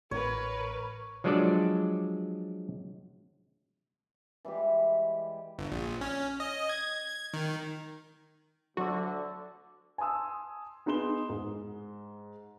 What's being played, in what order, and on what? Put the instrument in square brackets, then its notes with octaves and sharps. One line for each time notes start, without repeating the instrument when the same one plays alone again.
[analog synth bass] A1 [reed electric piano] A2 [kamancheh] A#4 B4 [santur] C#5 D#6
[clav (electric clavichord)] F3 F#3 G#3 D4 A4 D5
[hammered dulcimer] E3 G3 G#3 G4
[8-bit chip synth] G1
A#1
C#4
D#5
G#6
D#3
[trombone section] D2 D3 [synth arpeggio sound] F#3 F#4
[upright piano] G#5 A5 C6 D#6 E6
B3 D#4 G#4 C6 E7 G7
G#2